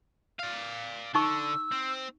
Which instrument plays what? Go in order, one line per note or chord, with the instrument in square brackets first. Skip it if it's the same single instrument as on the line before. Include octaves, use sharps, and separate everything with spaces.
[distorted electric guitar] D5 F5
[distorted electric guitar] D3 [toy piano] D#4 C#6 [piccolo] E6
[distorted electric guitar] C4